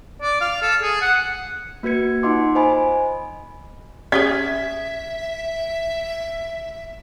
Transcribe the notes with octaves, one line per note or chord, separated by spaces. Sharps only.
D5
F5
A4
G#4
F#5
A#3 F#4 B4 G#6 C#7
D#4 F4 D#5 F#5 C6 D6
C5 D#5 G#5 B5
C#4 G4 G#4 E5 G#6 B6